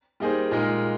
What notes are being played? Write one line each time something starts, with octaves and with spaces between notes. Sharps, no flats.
G3 A#3 D#4 G#4 C5
A#2 G#3 D#4 A#4